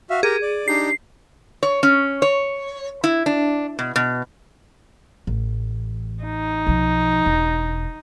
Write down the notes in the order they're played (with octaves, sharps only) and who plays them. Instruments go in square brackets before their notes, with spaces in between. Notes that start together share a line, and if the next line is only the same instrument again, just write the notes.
[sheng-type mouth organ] F#4 E5 F5
[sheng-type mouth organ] G4 A#4 [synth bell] G#4
[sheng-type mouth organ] D5
[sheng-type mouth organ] D4 D#4 G4 [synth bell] C7
[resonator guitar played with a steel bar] C#5
C#4
C#5
E4
D4
B2
B2
[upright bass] A1
[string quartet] D#4
[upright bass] B1 F3
E1